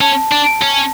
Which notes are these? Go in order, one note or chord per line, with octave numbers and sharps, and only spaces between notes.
C#4 A5
D4
C#4